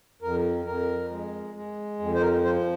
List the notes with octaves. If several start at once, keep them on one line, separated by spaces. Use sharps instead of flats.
F2 A#4
F2 A#4
G#3
G#3
F2
C5
A#4
F3 C5